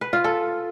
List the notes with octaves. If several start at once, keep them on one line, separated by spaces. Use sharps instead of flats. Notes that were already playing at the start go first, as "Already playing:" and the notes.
B4
F4
A4